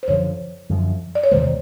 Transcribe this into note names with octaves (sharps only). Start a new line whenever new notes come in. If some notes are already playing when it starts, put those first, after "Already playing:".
C5
F#2 D3 F3 C#5
F#2 D3 F3
D5
C#5
E2 C3 D#3 G#3 C5